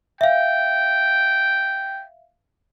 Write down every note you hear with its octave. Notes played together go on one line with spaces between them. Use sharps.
E5 F5 G5